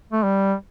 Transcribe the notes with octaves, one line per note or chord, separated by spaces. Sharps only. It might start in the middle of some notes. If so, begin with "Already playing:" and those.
A3
G3